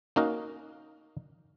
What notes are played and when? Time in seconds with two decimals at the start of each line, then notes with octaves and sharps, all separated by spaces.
0.16 A#3 C#4 D#4 F#4 A#4